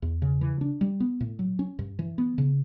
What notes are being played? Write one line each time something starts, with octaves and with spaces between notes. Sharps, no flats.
E2
C#3
E3
D4
G3
B3
A2
F#3
C#4
G2
E3
B3
C#3